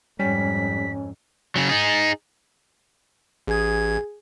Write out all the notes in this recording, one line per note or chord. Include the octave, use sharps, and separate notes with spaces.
F2 G#2 G3 C#4 B6
C#3 F#3
D#4 G#4
A1 G#4 G#6